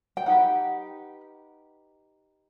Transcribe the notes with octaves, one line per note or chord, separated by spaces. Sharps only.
G5
D#4 G4 B4 F#5